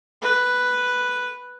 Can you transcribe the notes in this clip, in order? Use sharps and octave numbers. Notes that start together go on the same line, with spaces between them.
B4